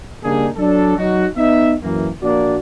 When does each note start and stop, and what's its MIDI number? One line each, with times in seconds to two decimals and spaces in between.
0.24 0.49 49
0.24 0.49 55
0.24 0.49 58
0.24 0.49 62
0.24 0.49 63
0.24 0.49 68
0.57 0.97 54
0.57 0.97 62
0.57 0.97 69
0.98 1.27 54
0.98 1.27 63
0.98 1.27 66
1.37 1.74 59
1.37 1.74 63
1.37 1.74 76
1.83 2.09 42
1.83 2.09 52
1.83 2.09 58
2.23 2.57 34
2.23 2.57 58
2.23 2.57 62
2.23 2.57 66
2.23 2.57 74